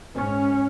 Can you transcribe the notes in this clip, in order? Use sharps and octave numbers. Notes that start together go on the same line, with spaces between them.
G#2 C#4